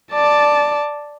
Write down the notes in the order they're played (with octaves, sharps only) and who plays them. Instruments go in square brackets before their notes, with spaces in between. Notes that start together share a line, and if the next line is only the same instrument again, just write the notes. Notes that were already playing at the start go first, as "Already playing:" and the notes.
[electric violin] D5 A5